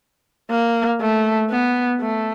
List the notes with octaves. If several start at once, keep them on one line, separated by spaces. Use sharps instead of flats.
A#3
A3
B3
A3